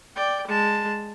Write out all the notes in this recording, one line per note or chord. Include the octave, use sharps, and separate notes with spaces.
D5 G5
G#3 A5